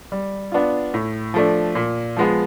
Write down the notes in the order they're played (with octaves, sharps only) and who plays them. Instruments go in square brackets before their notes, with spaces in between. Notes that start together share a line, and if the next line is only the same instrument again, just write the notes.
[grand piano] G3
B3 D4 F4
A2
F3 A3 D4
A#2
F3 G#3 B3